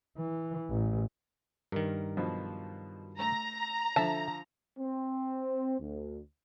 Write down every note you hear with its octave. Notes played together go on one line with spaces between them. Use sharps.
E3
A1
G2 D#3 A#4
B2 F3 F#3
A3 A#5
D3 F3 A4 E5 A5
C4
D2